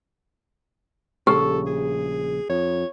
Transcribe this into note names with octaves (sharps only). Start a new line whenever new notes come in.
A#1 C#3 G4 A4
G#4
F2 C#5